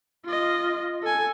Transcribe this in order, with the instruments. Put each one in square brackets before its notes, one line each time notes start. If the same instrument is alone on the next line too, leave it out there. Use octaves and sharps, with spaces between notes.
[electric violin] F4 D#5
A4 G#5